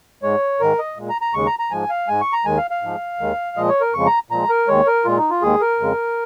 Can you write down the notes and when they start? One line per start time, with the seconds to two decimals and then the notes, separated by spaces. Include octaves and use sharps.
0.23 G#2 G#3 C#5
0.60 G#2 D#3 G#3 A#4
0.79 D#5
0.97 A#2 G#3
1.09 A#5
1.21 A#5
1.34 D#2 C#3 G#3 C#6
1.47 A#5
1.59 A#5
1.71 G#2 F3 G#3 G#5
1.89 F5
2.08 G#2 G#3 G#5
2.21 C#6
2.33 A#5
2.45 D#2 D#3 G#3 G#5
2.57 F5
2.71 F5
2.82 G#2 F3 G#3
3.20 D#2 D#3 G#3
3.57 A#2 F3 G#3 D#5
3.69 C#5
3.81 A#4
3.93 F2 C#3 F3 G#3 C#6
4.06 A#5
4.30 A#2 F3 G#3 A#5
4.50 A#4
4.68 D#2 D#3 G#3 C#5
4.87 A#4
5.05 A#2 G#3 F4
5.18 D#4
5.30 F4
5.42 D#2 D#3 G#3 G#4
5.61 A#4
5.80 F2 C#3 G#3